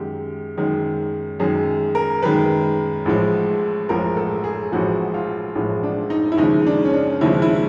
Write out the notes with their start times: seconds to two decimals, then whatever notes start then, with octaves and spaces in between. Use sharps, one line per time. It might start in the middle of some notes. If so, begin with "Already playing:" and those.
Already playing: F#2 D#3 G#3 G4
0.57 F#2 D#3 G#3
1.40 F#2 D#3 G#3 G#4
1.95 A#4
2.22 F#2 D#3 G#3 B4
3.06 A1 A2 F3 G#3
3.89 A1 A2 F3 G#3 A#4
4.17 A4
4.44 G#4
4.72 A1 A2 F3 G#3 F#4
5.14 F4
5.55 A1 A2 F3 G#3
5.83 D4
6.10 D#4
6.32 E4
6.38 D#2 C#3 F3 G#3 D#4
6.66 D4
6.85 C#4
6.93 D4
7.21 D#2 C#3 F3 G#3 E4
7.42 E4